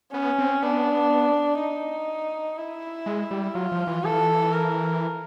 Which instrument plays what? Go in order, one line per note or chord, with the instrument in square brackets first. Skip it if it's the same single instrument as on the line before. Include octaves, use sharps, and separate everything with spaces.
[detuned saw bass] B3 [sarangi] C#4
[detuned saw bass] C4
[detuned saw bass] B3 [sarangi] D4
[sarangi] D#4
E4
[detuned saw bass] G#3
G3
[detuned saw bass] F#3 [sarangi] F4
[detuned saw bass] F3
E3
[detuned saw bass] E3 [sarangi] A4
[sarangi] A#4